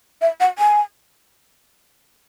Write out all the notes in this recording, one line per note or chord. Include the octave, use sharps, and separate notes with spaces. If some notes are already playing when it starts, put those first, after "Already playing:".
E5
F#5
G#5